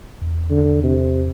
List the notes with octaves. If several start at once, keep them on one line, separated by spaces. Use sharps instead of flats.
E2
D3
C3